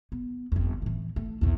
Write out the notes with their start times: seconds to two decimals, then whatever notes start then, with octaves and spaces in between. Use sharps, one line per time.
0.12 B3
0.52 G1 F2
0.82 A2 E3
1.16 A3
1.41 B1 E2